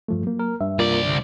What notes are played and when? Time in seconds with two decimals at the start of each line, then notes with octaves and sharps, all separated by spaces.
0.08 G2 F3 A3
0.24 F#3 A#3
0.39 A#4
0.61 G2 E5
0.79 C2 A#3 F4 A#4 D5
1.05 D3